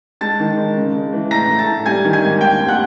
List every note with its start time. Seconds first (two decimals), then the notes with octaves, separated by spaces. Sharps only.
0.21 G#3 A5 A6
0.39 D#3
0.57 G#3
0.76 C#3
0.95 G#3
1.13 E3
1.31 A2 A#5 A#6
1.49 A3
1.59 A5 A6
1.67 A2
1.86 G3 G#5 G#6
2.04 D#3
2.13 G#5 G#6
2.23 G#2
2.41 D#2 G5 G6
2.59 F1
2.68 F#5 F#6